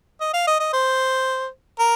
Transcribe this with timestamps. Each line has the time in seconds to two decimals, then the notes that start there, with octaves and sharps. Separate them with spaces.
0.21 D#5
0.33 F5
0.47 D#5
0.60 D#5
0.73 C5
1.79 A#4